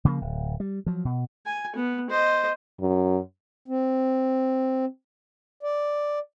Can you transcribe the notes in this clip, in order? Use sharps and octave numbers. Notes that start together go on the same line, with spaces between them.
C#3 F3 G3 A#3
D1
G3
F3 F#3
B2
G#5
B3
C5 D#5
F#2
C4
D5